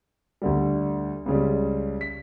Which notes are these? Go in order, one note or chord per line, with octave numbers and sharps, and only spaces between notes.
D2 D3 G3
C#2 C#3 G3
B6